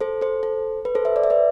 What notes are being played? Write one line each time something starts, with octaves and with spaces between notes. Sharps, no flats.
A4 C5
A4 C5
A4 C5
B4
A4 C5
C5 E5
D5
E5
B4 D5